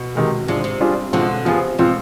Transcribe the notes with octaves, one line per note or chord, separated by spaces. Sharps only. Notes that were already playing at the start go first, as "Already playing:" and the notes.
Already playing: B2
C3 D#3 G#3
C3 F3 G#3 D4
C3
G3 D4 F4 G#4
B2 D3 F3 G#3 C4
C3 F3 B3 F4 G#4
B2 F3 G#3 C4 F4